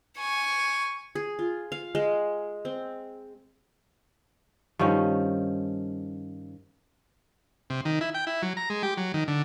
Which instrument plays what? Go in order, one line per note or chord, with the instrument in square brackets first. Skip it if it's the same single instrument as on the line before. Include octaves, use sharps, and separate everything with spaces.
[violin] G#5 C#6
[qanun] G#4
F4
F5
G#3
C4
[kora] G2 D#3 F3 C#4
[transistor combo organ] C3
D#3
E4
G5
E4
F#3
A#5
G#3
G4
F#3
D#3
D3